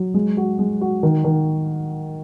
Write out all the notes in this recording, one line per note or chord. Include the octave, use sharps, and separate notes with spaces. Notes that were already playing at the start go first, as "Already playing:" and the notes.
Already playing: F#3
G#3
F#4
G#3
F#4
D#3
D#3